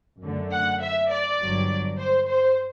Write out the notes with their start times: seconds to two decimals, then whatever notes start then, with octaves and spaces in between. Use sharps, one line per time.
0.23 F#2 D3 A3
0.52 F#5
0.82 E5
1.11 D5
1.40 G1 G2 F#3
1.98 C5
2.28 C5